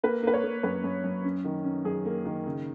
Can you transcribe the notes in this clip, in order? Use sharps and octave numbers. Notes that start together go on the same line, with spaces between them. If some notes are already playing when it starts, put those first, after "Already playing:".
A#3 B4
A#3 B4
C#5
A#3
F#2 B4
F#2
F#2
C#4
D#3
C#4
F#2 G#4
A#3
D#3
C#3